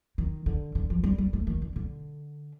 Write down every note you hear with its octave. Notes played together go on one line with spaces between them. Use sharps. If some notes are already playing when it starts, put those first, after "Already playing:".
D#3
D3
D3
F3
G3
G3
A3
D#3
D3
D3